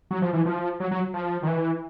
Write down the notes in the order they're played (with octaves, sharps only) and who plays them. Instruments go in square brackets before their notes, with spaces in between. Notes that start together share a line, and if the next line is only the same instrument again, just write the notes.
[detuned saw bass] F#3
F3
E3
F3
F#3
F#3
F3
D#3
E3